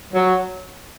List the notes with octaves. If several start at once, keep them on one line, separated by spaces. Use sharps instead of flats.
F#3